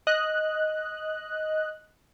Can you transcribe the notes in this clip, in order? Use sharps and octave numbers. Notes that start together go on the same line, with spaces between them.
D#5 F#6